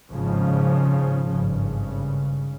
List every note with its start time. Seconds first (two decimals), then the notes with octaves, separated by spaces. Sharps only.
0.13 G#1 G#2 C#3 F3
1.31 G#1 G2 C#3